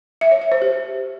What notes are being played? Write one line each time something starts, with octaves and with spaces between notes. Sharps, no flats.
E5
C#5
E5
C5
G4